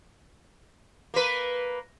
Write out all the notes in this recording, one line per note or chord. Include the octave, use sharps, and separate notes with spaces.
A#3 B4